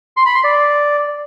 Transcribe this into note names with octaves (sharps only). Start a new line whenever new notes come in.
C6
B5
C6
D5